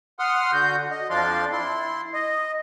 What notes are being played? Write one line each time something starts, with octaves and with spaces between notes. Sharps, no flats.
F#5 C6 D#6 F6
D3 F#4 G6
D#5
F2 F3 D4 D5 F5 C6
E4 C6
D#5